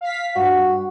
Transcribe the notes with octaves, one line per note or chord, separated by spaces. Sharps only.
F5 B6
G2 F#4